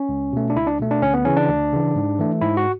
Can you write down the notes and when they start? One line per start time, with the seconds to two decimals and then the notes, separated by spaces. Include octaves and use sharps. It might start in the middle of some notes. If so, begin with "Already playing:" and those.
Already playing: C#4
0.09 C#2
0.33 B2 A3
0.50 D4
0.56 C#2 E4
0.67 D4
0.79 B2 A3
0.91 D4
1.02 D2 C#4
1.14 B3
1.25 C#3 E3 C#4
1.37 D4
1.49 D2
1.72 C#3 E3
1.95 G#2
2.19 E3 A3
2.41 G#2 E4
2.57 F#4